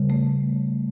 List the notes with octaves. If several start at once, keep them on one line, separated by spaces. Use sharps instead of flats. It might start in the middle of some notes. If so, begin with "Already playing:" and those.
Already playing: C#3 G3
A3